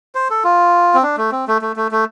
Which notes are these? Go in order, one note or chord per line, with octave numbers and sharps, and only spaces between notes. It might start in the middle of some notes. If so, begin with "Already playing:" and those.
C5
A4
F4
C4
D4
A3
C4
A3
A3
A3
A3